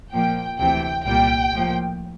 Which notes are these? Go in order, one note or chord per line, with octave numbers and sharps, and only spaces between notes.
A#2 F3 A#3 G5
D2 C3 E3 G5
C2 A#2 G3 A#3 G5
A2 F3 A#3